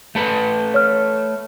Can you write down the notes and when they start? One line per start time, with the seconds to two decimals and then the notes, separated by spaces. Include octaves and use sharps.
0.15 A3 A4 B4
0.74 C#5 F6